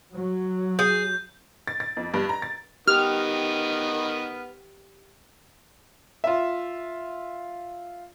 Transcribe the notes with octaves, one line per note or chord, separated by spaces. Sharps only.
F#3
G#4 G6
A6
A6
F2
G2
A#5
A6
D#3 B3 G4 F6
F4 E5